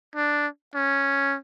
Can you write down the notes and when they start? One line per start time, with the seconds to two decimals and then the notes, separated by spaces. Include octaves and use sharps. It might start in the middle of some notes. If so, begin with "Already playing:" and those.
0.16 D4
0.75 C#4